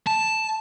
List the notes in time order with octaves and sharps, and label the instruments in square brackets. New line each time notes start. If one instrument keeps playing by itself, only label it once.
[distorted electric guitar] A5